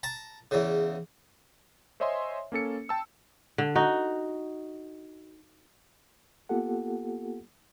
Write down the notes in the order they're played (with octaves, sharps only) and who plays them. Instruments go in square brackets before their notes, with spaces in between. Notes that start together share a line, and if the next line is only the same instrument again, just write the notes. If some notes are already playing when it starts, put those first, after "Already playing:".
[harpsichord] A5 A#5
E2 C#3
[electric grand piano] C5 C#5 D#5 E5 G#5 C6
A#3 C#4 A4 C#7
G5 A5 E6
[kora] D3
D#4 F#4
[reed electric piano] A#3 B3 F4 G4 A4 F#5